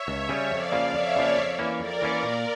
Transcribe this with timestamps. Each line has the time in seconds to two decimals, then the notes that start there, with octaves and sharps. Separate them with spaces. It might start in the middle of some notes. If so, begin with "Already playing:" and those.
Already playing: C#5 E5
0.08 C#2
0.29 C#3 G3 C#4
0.51 F2 D5 F5
0.72 C#3 F3 A#3
0.94 F2 C#5 E5
1.16 C#3 F3 A#3
1.37 F2
1.59 E3 A#3 C#4
1.80 F2 A#4 D5
2.02 E3 A#3 C#4
2.23 A#2